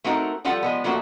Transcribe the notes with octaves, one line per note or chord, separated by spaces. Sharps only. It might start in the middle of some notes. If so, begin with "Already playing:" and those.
A3 C4 D#4 F#4 A#4
F3 G3 F4 A4 F#5
F3 G#3 B3
F3 A3 A#3 D4 F#4